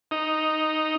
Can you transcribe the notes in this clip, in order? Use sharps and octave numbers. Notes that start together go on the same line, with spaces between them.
D#4